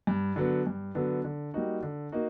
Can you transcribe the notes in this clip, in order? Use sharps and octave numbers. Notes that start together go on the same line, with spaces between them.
G2
D3 F#3 B3
G2
D3 F#3 B3
D3
G3 A#3 D#4 F#4
D3
A#3 D#4 F#4